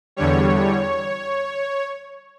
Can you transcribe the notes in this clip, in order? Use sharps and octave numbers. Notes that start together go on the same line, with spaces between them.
E2 D3 G3 C#5